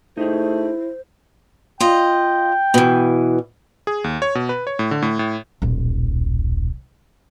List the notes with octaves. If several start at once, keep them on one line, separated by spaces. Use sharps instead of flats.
A3 D#4 E4 G4 G#4 C5
F4 D#5 G5
B2 E3
G#4
D#2
C#5
B2
B4
C#5
A2
D3
A2
A2
D#1 B1